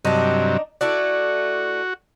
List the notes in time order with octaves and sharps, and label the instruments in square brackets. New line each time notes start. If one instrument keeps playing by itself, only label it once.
[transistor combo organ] G2 C3 F#3 [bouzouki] D4 D#4
[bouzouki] A3 E4 D5 [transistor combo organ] F#4